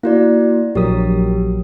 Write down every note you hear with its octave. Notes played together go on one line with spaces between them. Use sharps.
A#3 E4 F#4 D5
A#1 F#3 G4 A#4 D#6